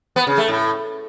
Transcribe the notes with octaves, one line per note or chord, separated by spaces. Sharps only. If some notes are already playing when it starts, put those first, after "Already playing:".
B3
C#3
A3
A2